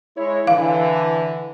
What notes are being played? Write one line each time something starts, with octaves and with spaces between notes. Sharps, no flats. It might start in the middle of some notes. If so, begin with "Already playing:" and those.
G#3 E4 C#5
D3 E3 F5